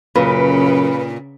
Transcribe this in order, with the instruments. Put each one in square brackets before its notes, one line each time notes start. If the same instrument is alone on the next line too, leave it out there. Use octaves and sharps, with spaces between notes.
[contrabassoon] F#2 [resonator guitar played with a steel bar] A#2 [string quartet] C#3 [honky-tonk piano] B4